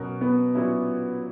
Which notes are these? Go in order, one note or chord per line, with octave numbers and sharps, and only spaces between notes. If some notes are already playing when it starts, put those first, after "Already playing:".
Already playing: B2 F#3 C#4 F#4 A#4
B3
A#2 F#3 C#4 E4